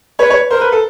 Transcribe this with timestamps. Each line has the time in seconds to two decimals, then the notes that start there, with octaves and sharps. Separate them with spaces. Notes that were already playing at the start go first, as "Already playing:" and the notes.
0.19 B4 C#5
0.30 C#5
0.51 A#4 C5
0.61 B4
0.72 A4